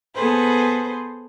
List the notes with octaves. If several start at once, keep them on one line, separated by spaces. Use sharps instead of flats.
B3 G#4 A4 B4 C5